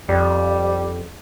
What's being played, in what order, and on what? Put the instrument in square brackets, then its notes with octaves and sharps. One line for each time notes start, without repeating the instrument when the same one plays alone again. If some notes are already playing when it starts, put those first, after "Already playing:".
[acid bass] F2 [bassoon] G3